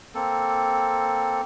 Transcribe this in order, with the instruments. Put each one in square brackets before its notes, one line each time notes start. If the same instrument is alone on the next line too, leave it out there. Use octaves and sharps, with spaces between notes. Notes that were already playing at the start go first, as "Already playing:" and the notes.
[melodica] A#3 C4 A4